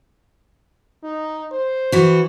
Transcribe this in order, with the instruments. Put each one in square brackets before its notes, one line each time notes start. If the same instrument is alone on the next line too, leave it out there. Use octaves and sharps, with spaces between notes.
[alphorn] D#4
C5
[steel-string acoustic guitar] E3 F#4